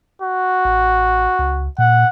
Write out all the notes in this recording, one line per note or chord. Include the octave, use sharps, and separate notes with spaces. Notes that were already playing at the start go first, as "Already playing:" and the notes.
F#4
A1
C#2
A#2 F#5